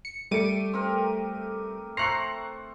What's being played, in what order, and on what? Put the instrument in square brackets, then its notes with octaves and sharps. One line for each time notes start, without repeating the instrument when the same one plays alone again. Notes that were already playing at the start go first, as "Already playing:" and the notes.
[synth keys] C#7
[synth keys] G3 D6 D#7 [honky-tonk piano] A3 C#7
[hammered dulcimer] C4 G4 A#4
[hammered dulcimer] A3 C5 [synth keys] A#5 F#6 [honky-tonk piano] C7 C#7